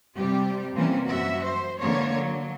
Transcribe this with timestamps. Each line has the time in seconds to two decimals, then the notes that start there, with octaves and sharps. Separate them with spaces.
0.17 C3 G3 G4
0.74 C3 E3 G3 A#3 C#4
1.07 F#2 F#4 E5
1.42 C5
1.78 D3 E3 A#3 C#5
2.15 F#3